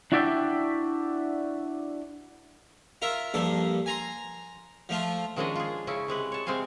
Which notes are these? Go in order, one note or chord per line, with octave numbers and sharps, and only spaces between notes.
D4 E4 F#4 D5 E5 G5
F4 A#4 E5
A#1 G2 A#3 A4
G#5 A#5 C6
F3 A3 F4
D#3 F3 G#3 C#4 D4 D#5
F4 G#4
C#3 C#4 E4
C3 G#3 B4
C#5 A5
C3 G#3 C4 F5 G#5